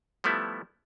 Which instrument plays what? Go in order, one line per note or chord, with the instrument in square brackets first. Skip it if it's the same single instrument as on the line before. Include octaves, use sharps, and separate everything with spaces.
[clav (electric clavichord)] F3 G3 A3 B3 E4